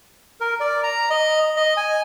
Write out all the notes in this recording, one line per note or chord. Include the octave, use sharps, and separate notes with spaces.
A#4
D5
A#5
D#5
D#5
G#5